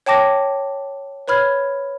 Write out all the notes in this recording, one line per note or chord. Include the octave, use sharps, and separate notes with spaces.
C#5 G5 A5 D6 A#6
B4 C#5 B5 F6 G#6